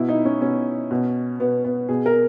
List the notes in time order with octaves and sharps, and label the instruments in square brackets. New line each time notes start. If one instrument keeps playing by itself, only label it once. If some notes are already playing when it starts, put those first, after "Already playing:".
Already playing: [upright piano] B2 E4
D#4
C#4
B2 C#4
B2
B2 B3
B3
B2 G#4
A#4